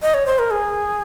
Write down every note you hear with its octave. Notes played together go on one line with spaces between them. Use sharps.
D#5
C#5
C5
A#4
G#4